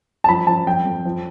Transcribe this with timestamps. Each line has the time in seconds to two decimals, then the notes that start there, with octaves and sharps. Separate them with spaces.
0.24 A5
0.29 F3 B5
0.47 F3 A5
0.67 F2 G5
0.86 F2
1.05 F3